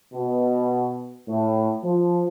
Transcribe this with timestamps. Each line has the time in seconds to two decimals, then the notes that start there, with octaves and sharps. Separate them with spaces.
0.13 B2
1.28 A2
1.84 F3